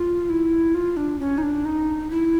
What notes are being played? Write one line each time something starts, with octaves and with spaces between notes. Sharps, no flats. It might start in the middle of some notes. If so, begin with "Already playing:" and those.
Already playing: F4
E4
F4
D4
C#4
D#4
D4
D#4
E4